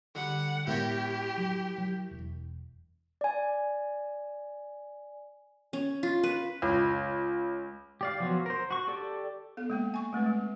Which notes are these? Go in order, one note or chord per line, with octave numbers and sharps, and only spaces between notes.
D3 G3 F#5
A2 G#3 B3 E4 G4 A#4 C#5
F#3
F#3
E1
D5 G#5
C#4
F4
B4
C#2
G4 D5 F5
F3 F#3 B3 F4 F#4
A#4 C5
F#4 C#6
G4 A4 D5
B3 A4
G#3 A#3 G5
G#5 C#6
G#3 A3 C4 B4
G#3